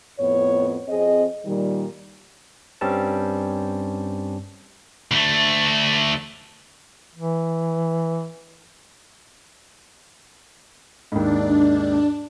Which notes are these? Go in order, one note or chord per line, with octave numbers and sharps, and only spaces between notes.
F2 A2 B3 C#5
F2 C4 G#4 D#5
A#2 D#3 G3
G2 G3 C4 C#4 A5
D2 A3
E3
D#2 G#2 D4